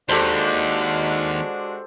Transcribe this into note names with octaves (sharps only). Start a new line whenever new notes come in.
D#2 G#3 D4 F#4 G4 A4 C5